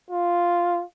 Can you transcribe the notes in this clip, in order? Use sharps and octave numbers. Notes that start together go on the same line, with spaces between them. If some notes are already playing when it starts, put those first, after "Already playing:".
F4